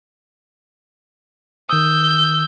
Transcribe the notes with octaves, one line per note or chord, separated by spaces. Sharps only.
D#3 D#6 E6 G6